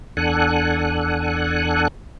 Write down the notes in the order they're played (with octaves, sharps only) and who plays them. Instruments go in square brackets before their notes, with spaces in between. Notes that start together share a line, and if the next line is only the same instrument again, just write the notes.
[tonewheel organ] E2 D4 A4 F#5 G#5 F#6